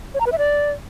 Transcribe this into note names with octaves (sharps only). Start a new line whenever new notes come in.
C#5
A#5
B4
E5
D5